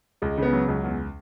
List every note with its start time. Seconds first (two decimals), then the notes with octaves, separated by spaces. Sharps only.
0.22 C#2 G#3
0.38 C#3 B3
0.53 F#3
0.68 C#2
0.84 E2